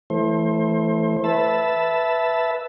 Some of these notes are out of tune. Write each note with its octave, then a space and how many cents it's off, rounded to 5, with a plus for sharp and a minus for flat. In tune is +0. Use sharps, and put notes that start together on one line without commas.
E3 +0 A3 +0 C5 +30
B4 +0 E5 +0 A5 -5